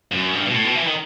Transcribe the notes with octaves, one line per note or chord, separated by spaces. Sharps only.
F#2
G2
B2
A2
B2
E3
D#3